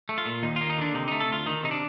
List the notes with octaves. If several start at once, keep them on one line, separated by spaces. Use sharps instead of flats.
A3
F4
A#2
D#2 D#4
A#3 F4
D#4
D3 D4
C3 D#4
A3 D#4
A4
D2 F4
D#3 D#4
C3 D#4
D4